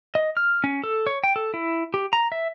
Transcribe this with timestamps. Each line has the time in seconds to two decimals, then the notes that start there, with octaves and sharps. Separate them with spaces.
0.15 D#5
0.37 F6
0.64 C#4
0.84 A4
1.07 C#5
1.24 G5
1.36 A4
1.54 E4
1.94 G4
2.13 A#5
2.32 E5